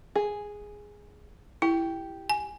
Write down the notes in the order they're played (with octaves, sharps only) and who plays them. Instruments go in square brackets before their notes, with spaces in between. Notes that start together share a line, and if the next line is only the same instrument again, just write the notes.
[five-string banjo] G#4
[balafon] E4 [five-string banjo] G4
[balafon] G#5